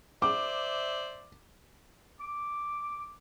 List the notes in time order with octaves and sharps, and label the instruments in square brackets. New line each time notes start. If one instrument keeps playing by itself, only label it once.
[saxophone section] C5 D5 E5 [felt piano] D6
[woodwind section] D6